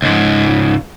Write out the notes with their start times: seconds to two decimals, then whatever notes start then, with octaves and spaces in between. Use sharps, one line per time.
0.02 C#2 G#2